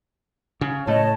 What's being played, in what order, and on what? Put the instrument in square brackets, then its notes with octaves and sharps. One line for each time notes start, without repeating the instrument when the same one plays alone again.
[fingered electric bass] C#3
[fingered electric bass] A2 A3 [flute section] C#5 D#5 A5